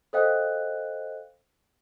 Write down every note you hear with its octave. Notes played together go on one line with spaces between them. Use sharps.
A4 C5 D#5 F5 G5 F#6